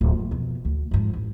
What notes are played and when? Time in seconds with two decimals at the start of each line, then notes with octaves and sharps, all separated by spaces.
0.01 D1 F2
0.19 F#1
0.31 F2 B2
0.65 D2
0.91 F2 G#2
1.13 A1